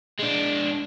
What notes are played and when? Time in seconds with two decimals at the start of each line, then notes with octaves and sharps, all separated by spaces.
0.20 G#3 D4